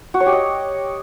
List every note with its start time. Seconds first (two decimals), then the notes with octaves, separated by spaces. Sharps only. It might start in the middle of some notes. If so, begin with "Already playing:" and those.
0.14 F#4
0.20 C#5
0.26 G4
0.32 D#5